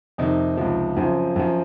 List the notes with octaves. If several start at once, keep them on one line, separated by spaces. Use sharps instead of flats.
F2 C3 D#3 D#4
C#2 C3 F3
F#2 C#3 F3 C4
F#2 F3